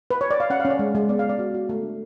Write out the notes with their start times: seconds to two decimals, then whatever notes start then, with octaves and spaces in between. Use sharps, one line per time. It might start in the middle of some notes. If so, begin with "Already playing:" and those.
0.11 B4
0.21 C#5
0.31 D5
0.40 F5
0.50 C#4 F#5
0.60 F5
0.65 C#4
0.70 D5
0.79 G#3
0.95 G#3
1.09 B3 D5
1.19 F5
1.24 B3
1.29 D5
1.39 F#4
1.54 F#4
1.69 A3
1.83 D4